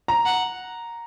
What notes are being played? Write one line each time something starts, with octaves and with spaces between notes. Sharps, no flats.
A#5
F#5